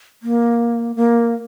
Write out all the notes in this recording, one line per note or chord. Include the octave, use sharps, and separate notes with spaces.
A#3
A#3